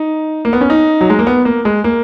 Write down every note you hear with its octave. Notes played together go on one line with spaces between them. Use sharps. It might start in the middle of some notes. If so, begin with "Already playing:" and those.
Already playing: D#4
A#3
B3
C#4
D#4
F#3
G#3
A#3
B3
A#3
G#3
A#3